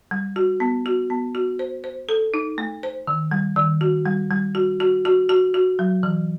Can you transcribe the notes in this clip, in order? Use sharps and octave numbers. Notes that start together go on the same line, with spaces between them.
G3
F#4
B3
F#4
B3
F#4
C5
C5
A4
D#4
A3
C5
D#3
G3
D#3
F#4
G3
G3
F#4
F#4
F#4
F#4
F#4
F#3
E3